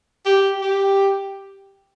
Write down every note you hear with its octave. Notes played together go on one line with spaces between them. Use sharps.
G4
G4